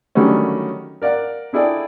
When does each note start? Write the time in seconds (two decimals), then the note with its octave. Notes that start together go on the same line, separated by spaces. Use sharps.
0.15 D3 D#3 F#3 G3 A3 C#4
1.02 A#4 D5 F5 F#5
1.53 D4 E4 G#4 A4 D5 G5